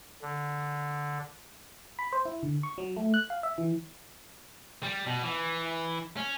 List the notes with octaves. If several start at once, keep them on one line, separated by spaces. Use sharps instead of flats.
D3
B5
C5
E4
D3
C#6
F#3
A3
F#6
F5
E5
E3
G3
B2
E3
C#4